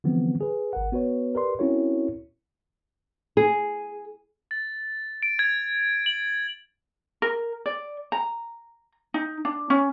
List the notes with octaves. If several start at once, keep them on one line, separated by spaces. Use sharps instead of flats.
D3 E3 F3 G3 B3 C4
G#4 B4
G#1 A#4 F#5
B3 F#4 B4 C#5
G4 A#4 B4 D5 C6
C4 C#4 E4 F#4 A#4 C#5
G#4
A6
D7
G#6
F#7
A#4
D5
A#5
D#4
D4
C#4